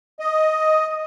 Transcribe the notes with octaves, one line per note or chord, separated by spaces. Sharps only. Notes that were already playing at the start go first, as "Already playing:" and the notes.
D#5